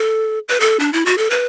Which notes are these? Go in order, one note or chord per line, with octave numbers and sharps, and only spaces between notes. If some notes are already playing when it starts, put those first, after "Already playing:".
Already playing: A4
B4
A4
D4
E4
F#4
A4
B4